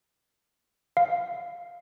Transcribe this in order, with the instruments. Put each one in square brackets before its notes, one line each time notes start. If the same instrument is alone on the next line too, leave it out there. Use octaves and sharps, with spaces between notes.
[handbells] F5